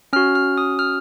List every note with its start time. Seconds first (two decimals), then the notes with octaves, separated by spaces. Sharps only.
0.13 C#4 F6
0.16 F#4
0.35 F6
0.58 D#6
0.79 F6